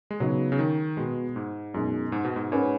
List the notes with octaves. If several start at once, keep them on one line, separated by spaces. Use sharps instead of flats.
G#3
C#3 F#3 B3 D#4
C#3
D#3
B2 G#3 B3 F#4
G#2
F#2 B2 G#3 D#4
G#2
B2
G#2
G#2 G#3 C#4 B4